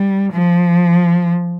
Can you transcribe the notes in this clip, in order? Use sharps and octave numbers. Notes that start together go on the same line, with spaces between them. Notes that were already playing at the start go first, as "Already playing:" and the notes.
Already playing: G3
F3